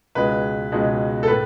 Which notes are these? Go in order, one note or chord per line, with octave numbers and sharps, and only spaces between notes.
C#2 B2 G#3 B4
C#2 B2 G#3
A4
A2 B4